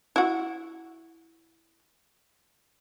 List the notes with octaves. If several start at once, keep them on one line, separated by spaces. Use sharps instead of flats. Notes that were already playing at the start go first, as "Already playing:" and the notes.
E4 F#4